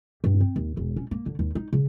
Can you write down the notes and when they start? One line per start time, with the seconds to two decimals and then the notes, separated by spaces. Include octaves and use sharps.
0.24 G2
0.40 C4
0.56 D#2
0.77 E1
0.96 C#4
1.11 A#3
1.26 D3
1.39 D#2
1.55 D#4
1.73 C#3